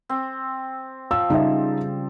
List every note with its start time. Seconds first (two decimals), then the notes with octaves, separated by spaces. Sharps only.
0.09 C4
1.11 F3 E6
1.30 C#3 G3 D#4 E5